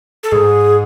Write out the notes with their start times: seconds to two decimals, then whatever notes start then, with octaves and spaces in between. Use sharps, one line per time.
0.23 A4
0.32 G#2 G#4